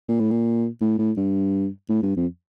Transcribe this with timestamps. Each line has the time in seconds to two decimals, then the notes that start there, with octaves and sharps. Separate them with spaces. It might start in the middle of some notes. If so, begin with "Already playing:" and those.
0.09 A#2
0.19 A2
0.31 A#2
0.81 A2
0.99 A2
1.17 G2
1.89 A2
2.03 G2
2.16 F2